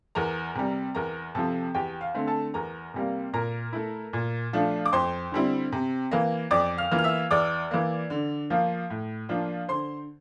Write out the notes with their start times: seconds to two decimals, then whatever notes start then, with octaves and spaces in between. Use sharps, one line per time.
0.15 E2 A#4 A#5
0.55 C3 G3
0.95 E2 A#4 A#5
1.35 C3 F3 A4 A5
1.74 E2 G4 G5
2.01 F5
2.14 D3 A3 C4
2.27 A4 A5
2.54 E2 A#4 A#5
2.94 C3 G3 A#3
3.33 A#2 A#4 A#5
3.73 A3 E4
4.13 A#2
4.53 F3 A3 D4 F4
4.86 D6
4.92 F2 C5 C6
5.32 D3 G3 C4 E4
5.72 C3
6.11 E3 A#3
6.51 F2 D5 D6
6.78 F5 F6
6.92 E3 A#3 F4
6.99 F6
7.04 E5 E6
7.31 E2 D5 D6
7.71 E3 A#3
8.10 D3
8.50 F3 A#3 F4
8.90 A2
9.29 F3 A#3 D4 F4
9.68 D3 C5 C6